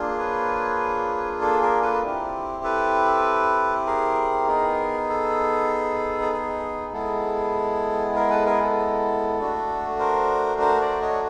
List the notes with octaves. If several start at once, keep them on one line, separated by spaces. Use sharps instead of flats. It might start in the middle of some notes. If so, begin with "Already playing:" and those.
Already playing: A#3 D4 F4 G#4
B4 C#5
A4
G#4 A#4
A4 B4
C4 E4 G4
A4 B4
G#4 A#4
B3 D#4 G#4
A4
A4
G#4
G#3 B3 E4 G#4 A4
G#4 A#4
A4 B4
G#4 A#4
A4
A3 D4 F#4
A#4 C5
A#4 C5
C5 D5
C#5 D#5